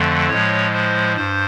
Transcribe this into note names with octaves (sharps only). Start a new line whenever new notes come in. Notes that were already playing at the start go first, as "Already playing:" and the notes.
Already playing: F2 D3 F3 A3
A2 F3 G#3 C#5
C5
G2 C5